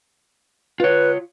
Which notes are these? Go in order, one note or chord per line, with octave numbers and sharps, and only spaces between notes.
F4 B4 C#5